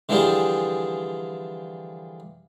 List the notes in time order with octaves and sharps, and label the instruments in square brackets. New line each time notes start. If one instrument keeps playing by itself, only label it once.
[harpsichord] D3 E3 F3 G3 G#4